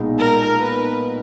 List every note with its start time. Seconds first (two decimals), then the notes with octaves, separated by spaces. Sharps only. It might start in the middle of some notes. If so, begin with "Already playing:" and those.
Already playing: B1 A#2 G#3 B3 D#4
0.19 A#4
0.60 B4